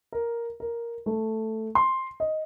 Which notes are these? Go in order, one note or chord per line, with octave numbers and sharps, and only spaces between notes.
A#4
A#4
A3
C6
D#5